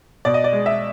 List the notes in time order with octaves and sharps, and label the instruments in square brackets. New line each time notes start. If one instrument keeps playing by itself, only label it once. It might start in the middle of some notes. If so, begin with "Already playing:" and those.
[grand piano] B2 D5
D#5
D5
G#3
E5